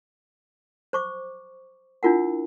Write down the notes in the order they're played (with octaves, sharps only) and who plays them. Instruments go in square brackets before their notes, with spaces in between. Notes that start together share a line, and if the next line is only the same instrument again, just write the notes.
[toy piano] C5 C#6 D6
D4 E4 F4 A#4 F#5